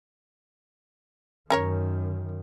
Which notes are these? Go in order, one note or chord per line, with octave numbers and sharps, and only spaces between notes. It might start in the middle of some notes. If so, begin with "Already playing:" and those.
F#2 D#3 C#4 A#4 C#5